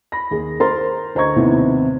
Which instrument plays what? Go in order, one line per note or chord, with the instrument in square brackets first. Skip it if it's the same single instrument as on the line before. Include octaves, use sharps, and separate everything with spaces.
[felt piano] B5 A#6
D#2 G#4
A#4 C5 A#5 C6 A6
D2 C5 D#5 A#5 C#6 G#6
D#2 A2 C3 D#3 B3 C4